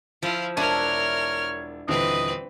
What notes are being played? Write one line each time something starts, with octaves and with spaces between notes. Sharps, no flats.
F3 E4 F4
E1 D4 E4 A#4 C#5 A5 F6 D#7
D#1 D3 E3 C4 B4 D#5